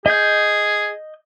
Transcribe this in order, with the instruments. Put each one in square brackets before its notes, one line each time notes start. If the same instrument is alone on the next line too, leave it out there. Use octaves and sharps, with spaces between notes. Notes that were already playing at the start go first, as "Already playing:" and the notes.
[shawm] G#4 [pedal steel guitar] D#5 G6